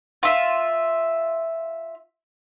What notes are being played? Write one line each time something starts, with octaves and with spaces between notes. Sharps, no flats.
F4 E5